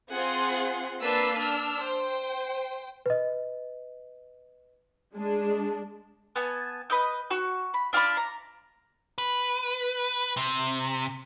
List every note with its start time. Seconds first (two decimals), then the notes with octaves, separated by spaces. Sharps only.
0.11 C4 F4 G#4 F#5 C6
1.01 A#3 D4 B4 A5 E6 C7
1.38 D4 E6 F6
1.78 C5 G5
3.06 B4 D#5
5.15 G#3 D4
6.36 B3 G#5 A5
6.90 B4 D#5 G6
7.31 F#4 C#6
7.74 B5
7.93 D4 F4 D5 B5
8.17 A#5
9.18 B4
10.37 C3